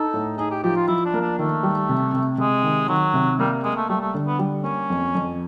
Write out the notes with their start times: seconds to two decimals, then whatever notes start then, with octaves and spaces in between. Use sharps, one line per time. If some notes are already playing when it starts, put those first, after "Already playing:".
Already playing: D#4 A4
0.14 A2
0.38 D#4 G#4
0.51 G4
0.63 F3 G4
0.76 F4
0.88 F3 E4
1.05 D4
1.14 A#3
1.21 D4
1.39 D#3 A3
1.63 G3
1.89 C3
2.13 C3
2.38 C3 G#3
2.63 D#3
2.88 D#3 F#3
3.14 C3
3.39 G3 A#3
3.64 G#3 A#3
3.77 A3
3.89 G3 A3
4.01 A3
4.14 D3
4.27 B3
4.39 G3
4.64 A#3 C#4
4.90 F2
5.15 F2